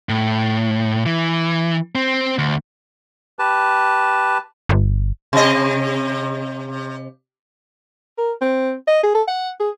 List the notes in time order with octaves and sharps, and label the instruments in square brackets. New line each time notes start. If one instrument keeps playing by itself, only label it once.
[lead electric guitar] A2
E3
C4
D2
[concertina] G4 B4 A5
[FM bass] G1
[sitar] C3 D#5
[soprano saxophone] A#4
C4
D#5
G#4
A4
F#5
G#4